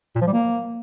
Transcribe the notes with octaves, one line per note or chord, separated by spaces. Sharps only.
A#2
F3
G3
A#3